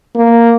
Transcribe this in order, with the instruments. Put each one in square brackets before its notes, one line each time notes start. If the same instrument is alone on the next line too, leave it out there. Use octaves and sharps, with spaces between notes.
[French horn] A#3